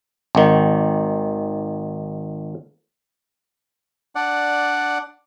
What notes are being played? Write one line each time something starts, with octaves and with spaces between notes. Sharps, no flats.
G#1 D#3
D4 D5 F#5